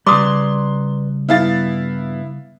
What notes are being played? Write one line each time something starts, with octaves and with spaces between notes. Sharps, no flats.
C#3 G3 B4 D5 A#5 C6 D6 D#6
G2 B3 E4 F5 A6